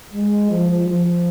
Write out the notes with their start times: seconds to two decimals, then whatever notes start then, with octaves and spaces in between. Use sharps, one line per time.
0.13 G#3
0.51 F3
0.88 F3